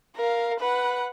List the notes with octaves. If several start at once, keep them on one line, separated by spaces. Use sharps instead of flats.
A#4 F5
B4 F#5